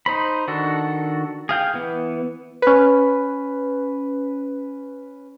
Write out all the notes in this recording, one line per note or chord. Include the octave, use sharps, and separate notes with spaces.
D#4 C5 B5
D#3 D4 F#4 A4
G#4 F5 G5
E3 B3
C#4 B4